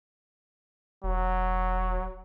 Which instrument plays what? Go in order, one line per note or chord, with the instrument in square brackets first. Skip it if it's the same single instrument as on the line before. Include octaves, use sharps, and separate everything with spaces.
[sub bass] E1 [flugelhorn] F#3